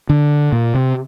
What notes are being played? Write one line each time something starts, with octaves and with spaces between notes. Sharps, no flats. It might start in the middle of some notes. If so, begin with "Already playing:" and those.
D3
A#2
C3